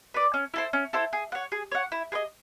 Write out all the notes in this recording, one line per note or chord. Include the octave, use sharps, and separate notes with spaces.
B4 D5
C#4
E4 A4 C5
C#4
E4 A4 C5
G#4
C#5 F#5
G#4
C#5 F#5
E4
G#4 B4 D#5